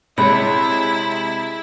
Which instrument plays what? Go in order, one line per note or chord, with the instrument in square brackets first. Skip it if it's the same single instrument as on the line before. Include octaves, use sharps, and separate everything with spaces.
[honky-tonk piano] C3 G#3 F#6 [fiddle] E4 [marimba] C#5 B5